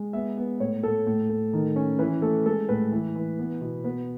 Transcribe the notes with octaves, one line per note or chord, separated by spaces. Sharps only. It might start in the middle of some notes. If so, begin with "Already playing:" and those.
Already playing: G#3
B3 E5
B3
A2 C#5
A2 A4
A2
A2
D#3
C#4
E3 B4
A3 A4
G#3 A4
A2 B4
E3
E3
B3
B2
B3 B4